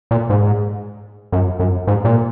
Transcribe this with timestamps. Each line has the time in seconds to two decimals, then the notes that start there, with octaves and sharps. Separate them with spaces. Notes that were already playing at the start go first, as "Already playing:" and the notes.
0.11 A#2
0.30 G#2
1.32 F#2
1.59 F#2
1.87 G#2
2.05 A#2